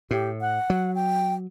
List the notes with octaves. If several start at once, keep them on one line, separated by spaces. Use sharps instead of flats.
A2 G4
F#5
F#3
G5